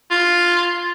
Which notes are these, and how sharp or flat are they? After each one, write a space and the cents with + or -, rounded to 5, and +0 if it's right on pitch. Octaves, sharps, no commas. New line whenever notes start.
F4 +0